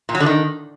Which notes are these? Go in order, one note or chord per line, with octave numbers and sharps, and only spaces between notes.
A#2
F#3
D3
D#3